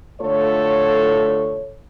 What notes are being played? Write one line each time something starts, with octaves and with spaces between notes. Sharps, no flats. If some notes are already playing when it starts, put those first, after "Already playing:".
D3 A3 F4 A4 C#5